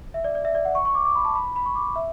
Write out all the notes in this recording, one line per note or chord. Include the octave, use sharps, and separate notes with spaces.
E5
D5
D5
E5
D5
F#5
C#6
C#6
D6
D6
B5
A5
B5
B5
C#6
D6
E5